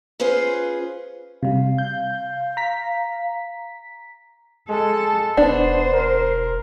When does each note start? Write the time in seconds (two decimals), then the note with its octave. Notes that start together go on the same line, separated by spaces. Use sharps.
0.20 C#4 F4 G#4 B4 C5
1.43 C3 G3 F5
1.78 G6
2.57 A#5 B6
4.69 G#3 A4
5.37 E1 B3 D4 C5
5.93 A#4